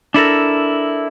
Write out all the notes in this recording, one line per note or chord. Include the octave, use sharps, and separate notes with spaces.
D4 E4 A4 A#4